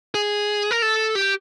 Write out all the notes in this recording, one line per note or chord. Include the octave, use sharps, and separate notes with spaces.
G#4
A#4
A4
G4